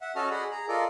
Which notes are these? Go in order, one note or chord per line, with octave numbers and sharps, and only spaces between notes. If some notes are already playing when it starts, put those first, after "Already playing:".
E5 F#5
C#4 F#4 A4 D#5 A5 F6
G#4 D5 D#5 F#5 B5
G#4 A#5
F4 A4 A#4 D5 D#5